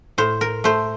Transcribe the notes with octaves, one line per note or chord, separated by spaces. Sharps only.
A2 C5
A#4
A3 C5